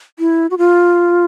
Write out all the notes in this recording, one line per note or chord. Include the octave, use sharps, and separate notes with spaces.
E4
F#4
F4